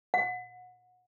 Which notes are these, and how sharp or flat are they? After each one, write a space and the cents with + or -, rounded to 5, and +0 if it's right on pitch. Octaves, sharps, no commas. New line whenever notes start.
F#5 -25